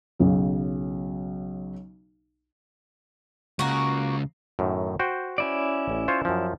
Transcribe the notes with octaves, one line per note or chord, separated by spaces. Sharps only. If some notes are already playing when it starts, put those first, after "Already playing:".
B1 C#3 F#3
C#2 C#3 A#3 F#4
F#2 A2 D#3
F#4 C5 G5
C#4 E4 D5
A1
F4 C5 C#5
F#2 F3